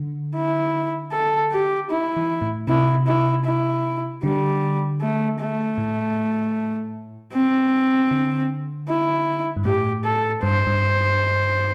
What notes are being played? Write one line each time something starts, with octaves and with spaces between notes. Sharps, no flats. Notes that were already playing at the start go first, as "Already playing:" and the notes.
Already playing: D3
E4
A4
G4
E4
E3
A2
C3 E4
E4
E4
D3 G3
A3
A3
A2
C4
D3
E4
G2
A2 G4
A4
G2 C5
G2